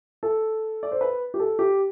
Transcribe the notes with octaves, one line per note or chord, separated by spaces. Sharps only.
A4
D5
C5
B4
G4
A4
G4